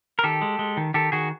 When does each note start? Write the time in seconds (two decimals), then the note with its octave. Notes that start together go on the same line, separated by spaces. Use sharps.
0.19 A#4
0.24 D#3 G4 A4
0.42 G#3
0.59 G#3
0.77 D#3
0.94 D#3 G4 A4
1.12 D#3 F#4 G#4